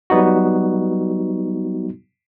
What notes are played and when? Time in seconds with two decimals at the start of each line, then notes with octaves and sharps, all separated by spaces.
0.10 F#3 G3 B3 D#4 F#4